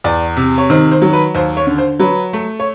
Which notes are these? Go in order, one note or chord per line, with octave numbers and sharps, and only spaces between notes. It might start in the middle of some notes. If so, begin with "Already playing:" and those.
E2 D5
C3
C#5
D#3 C5
C5
F#3
B4
D#2 C5
C#5
D3
C5
F#3 B4
A3
C#5